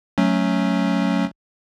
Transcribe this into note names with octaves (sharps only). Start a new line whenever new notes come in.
F#3 A3 C#4